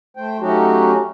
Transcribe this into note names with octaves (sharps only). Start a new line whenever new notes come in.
A3 C5 G5
F#3 A3 C#4 D#4 F#4 G4